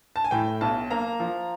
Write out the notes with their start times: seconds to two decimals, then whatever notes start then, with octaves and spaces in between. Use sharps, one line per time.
0.16 A5
0.24 G#5
0.31 A2 G5
0.61 B1 A5
0.91 A#3 A#5
1.20 F3